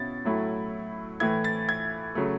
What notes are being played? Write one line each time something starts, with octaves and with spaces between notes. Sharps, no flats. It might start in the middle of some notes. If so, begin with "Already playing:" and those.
Already playing: B2 C#4 E4 A6
A2 F#3 A3 E4
A2 E3 A3 E4 G#6
A6
G#6
C#3 F#3 A3